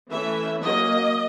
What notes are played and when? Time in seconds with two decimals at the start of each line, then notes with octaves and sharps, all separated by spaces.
0.11 E3 A3 C#4 E5
0.64 F#3 A#3 C#4 D#5